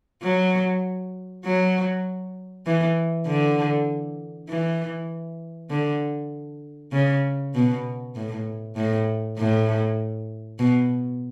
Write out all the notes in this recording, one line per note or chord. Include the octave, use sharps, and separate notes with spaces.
F#3
F#3
E3
D3
E3
D3
C#3
B2
A2
A2
A2
B2